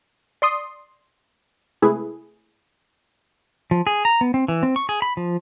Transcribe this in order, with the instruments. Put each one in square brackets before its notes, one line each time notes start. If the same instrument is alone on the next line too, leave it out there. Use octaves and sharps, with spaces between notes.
[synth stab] D5 C6 D#6
C3 G#3 A3 E4 G#4 B4
[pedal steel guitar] F3
G#4
A#5
B3
C4
E3
C4
C#6
G#4
B5
F3